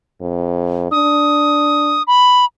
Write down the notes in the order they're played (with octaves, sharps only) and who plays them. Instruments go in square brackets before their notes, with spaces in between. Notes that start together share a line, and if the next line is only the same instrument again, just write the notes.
[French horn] F2
[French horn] D4 [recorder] D#6
[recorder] B5